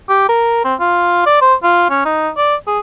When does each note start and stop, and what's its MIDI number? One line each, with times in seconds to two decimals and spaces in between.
0.09 0.28 67
0.29 0.63 70
0.64 0.75 60
0.80 1.22 65
1.26 1.40 74
1.42 1.55 72
1.63 1.88 65
1.90 2.01 61
2.05 2.30 63
2.37 2.55 74
2.67 2.79 68